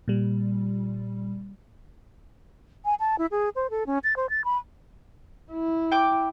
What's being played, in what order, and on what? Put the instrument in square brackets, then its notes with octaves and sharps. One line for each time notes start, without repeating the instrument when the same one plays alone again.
[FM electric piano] A#2 G3
[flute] G#5
A5
E4
G#4
C5
A4
C#4
A6
C5
A6
B5
[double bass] E4
[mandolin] G5 D6